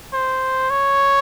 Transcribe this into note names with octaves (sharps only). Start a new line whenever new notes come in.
C5
C#5